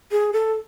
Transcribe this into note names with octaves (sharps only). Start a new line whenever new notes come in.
G#4
A4